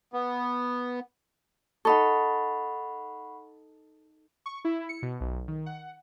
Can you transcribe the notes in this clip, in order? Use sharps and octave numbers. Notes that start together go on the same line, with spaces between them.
B3
D#4 A4 F#5 B5 C#6
C#6
E4
C#7
B2
B1
D#3
F#5